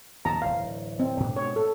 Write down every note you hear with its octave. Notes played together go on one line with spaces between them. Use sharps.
D#2 A#2 F#3 A5 A#5
D1 G1 E3 F5
C4
G#2 B2 D4
C#5
A4